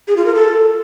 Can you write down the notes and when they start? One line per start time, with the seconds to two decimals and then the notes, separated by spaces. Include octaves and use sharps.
0.08 G#4
0.17 F4
0.26 A#4
0.35 A4